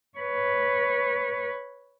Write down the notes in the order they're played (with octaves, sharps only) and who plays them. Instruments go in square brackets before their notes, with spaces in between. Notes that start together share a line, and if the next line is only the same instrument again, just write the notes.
[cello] B4 C#5